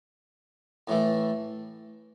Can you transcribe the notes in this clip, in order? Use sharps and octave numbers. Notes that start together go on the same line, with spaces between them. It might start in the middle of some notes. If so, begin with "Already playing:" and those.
A2 E3 A3